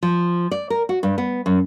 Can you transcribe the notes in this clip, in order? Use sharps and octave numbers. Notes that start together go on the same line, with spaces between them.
F3
D5
A#4
F#4
G2
B3
F#2